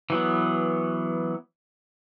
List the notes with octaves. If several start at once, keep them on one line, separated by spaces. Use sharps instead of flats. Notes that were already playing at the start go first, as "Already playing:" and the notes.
E3 F#3 B3